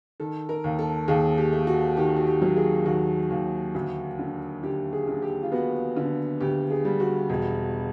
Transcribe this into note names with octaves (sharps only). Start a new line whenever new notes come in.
D#3 A4
A#4
D#2
A4
D#2 G#4
G4
A3
F#4
D#3 G4
F#4
G4
F#3
G#4
D#2 F#4
D#2
D2 F#4
D3
D3 G4
G#4
D3
G4
F4
B3 F#4
D3
D2 G4
G#4
G3
F#4
E1